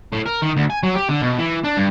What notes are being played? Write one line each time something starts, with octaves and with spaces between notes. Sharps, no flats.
A2
A#4
D#3
D2
G#5
F#3
G4
D3
B2
E3
D4
G2